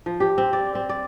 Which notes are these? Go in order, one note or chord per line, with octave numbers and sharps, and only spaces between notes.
F3
G4
C4
D5
C4
D5